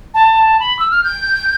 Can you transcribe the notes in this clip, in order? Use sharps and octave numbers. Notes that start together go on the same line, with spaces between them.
A5
B5
E6
F6
G6